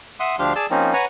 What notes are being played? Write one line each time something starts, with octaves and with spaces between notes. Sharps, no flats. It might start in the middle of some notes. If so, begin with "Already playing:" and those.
E5 F#5 C6 D#6
D2 F3 D4 G4 F5 C6
G#4 D5 A5 E6
F3 A#3 C4 C#4 D#4
B4 C#5 F#5 G#5 A#5